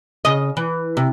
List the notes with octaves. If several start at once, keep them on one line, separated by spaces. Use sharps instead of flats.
C#3 D#5
E3
C3